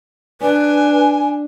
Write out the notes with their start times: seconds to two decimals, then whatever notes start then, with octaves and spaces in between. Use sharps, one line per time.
0.41 D4 B4 G#5